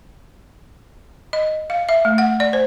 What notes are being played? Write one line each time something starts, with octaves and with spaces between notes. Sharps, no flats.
D#5
F5
E5
A3
F#5
D5
C5